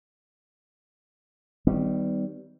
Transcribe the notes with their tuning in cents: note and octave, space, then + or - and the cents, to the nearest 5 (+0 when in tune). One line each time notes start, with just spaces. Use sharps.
D#3 +0 G3 -15 B3 +35